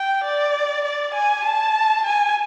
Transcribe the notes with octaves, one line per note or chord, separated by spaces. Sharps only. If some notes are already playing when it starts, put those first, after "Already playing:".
Already playing: G5
D5
D5
G#5
A5
G#5